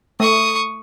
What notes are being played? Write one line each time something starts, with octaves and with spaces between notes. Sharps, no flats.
A3 C#6 D#6